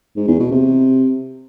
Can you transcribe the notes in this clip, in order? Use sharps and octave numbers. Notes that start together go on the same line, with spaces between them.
G#2
E2
B2
C3